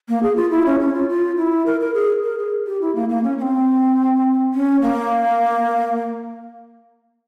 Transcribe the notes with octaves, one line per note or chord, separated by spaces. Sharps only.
A#3
G#4
F4
E4
C#4
C#4
F4
F4
E4
A#4
A#4
G#4
A#4
G#4
G4
E4
A#3
A#3
C#4
C#4
C4
C#4
A#3